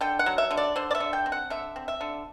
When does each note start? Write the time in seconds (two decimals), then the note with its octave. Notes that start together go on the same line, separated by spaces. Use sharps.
0.01 D3 G5
0.19 F#5
0.26 F#3
0.38 E5
0.51 D3
0.57 D5
0.76 D3 C5
0.91 D5
0.95 E5
1.00 D3
1.13 G5
1.26 C4
1.32 F#5
1.50 D3 E5
1.76 C4
1.88 E5
2.01 D3